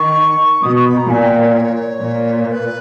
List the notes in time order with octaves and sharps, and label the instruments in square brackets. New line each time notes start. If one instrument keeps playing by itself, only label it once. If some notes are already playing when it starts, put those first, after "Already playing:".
Already playing: [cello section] D#3 [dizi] C#6
[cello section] B2 [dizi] D#6
[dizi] C#6
B5
A#5
[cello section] A#2 [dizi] G#5
[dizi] G5
C#5
[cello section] A#2
[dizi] C#5
B4